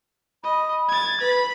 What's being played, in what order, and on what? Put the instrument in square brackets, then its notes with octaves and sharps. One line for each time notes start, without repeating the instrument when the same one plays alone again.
[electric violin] D#5 [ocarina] B5
[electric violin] G#6 A6
[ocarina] B4 [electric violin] B5